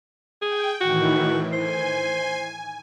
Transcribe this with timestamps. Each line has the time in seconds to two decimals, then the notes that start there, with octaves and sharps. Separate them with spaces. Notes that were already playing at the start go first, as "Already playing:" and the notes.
0.42 G#4 G5
0.81 A2 D#3 E3 F#4
1.53 C5 G#5